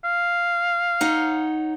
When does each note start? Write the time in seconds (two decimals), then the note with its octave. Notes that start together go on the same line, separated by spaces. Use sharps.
0.04 F5
1.01 D#4 C#5 F#5